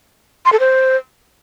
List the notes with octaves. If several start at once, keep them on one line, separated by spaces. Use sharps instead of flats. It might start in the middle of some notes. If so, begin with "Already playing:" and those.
C6
A4
C5